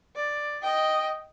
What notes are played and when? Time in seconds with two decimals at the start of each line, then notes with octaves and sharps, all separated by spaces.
0.15 D5
0.63 D#5 G5